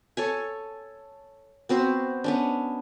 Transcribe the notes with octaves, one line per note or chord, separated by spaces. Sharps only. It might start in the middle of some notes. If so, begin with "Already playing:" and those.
A4 C#5 G#5
B3 C4 F#4 C5
B3 C#4 D4